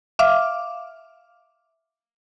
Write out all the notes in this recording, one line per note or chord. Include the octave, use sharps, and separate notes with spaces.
E5 F5 D6 F6